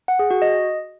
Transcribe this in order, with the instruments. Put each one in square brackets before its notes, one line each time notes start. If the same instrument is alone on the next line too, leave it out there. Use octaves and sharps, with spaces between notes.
[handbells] F#5
G#4
F#4
D#5